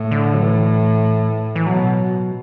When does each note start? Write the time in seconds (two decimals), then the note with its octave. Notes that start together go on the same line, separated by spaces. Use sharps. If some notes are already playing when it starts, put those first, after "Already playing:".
Already playing: A2
0.11 D3
0.34 F#3
0.42 E3
1.56 E3
1.66 B2 F#3